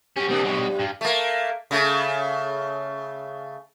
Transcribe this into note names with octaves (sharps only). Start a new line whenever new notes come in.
C#4 F#4 G4
C3 G3 A#3 D4 G#4
F#2 B2 F#3 G3
G2
A3 A#3
C#3 A3